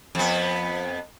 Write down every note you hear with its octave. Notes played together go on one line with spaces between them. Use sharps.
F2 B3